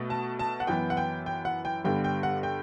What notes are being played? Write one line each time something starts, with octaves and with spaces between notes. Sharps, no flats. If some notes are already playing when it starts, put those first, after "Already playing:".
Already playing: B2 A3
A5
A5
F#5
F#2 E3 B3 G5
F#5
G5
G5
F#5
G5
G2 D3 G3 B3 G5
G5
F#5
G5